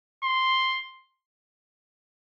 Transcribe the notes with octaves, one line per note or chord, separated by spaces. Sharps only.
C6